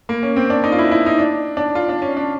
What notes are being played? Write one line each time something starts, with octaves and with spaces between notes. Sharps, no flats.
A#3
C#4
C4
D4
D#4
F4
E4
E4
D#4
D4
D4
F4
D4
C#4
D4